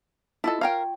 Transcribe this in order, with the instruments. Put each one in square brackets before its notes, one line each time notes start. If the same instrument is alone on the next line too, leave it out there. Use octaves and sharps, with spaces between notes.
[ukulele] E4 F4 D#5 [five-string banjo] A4 A5
[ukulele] F4 C#5 G5 [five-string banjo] A#4 F5